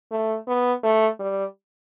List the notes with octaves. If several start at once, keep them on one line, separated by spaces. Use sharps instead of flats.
A3
B3
A3
G3